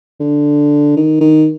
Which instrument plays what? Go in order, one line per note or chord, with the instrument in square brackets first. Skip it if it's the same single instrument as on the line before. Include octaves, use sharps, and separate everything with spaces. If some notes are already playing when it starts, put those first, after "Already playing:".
[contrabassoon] D3
D#3
D#3